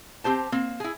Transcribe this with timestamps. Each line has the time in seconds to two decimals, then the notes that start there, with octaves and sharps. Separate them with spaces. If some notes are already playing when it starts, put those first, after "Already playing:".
0.24 C4 G4 C5 A5
0.52 A#3 C4
0.80 E4 G#4